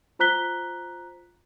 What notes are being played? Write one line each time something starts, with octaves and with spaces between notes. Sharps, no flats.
F4 C5 A#5 F#6 B6 G7